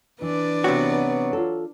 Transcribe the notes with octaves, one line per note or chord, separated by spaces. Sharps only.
E3 D4 B4 D5
C3 F#3 B3 F#4
F4 A4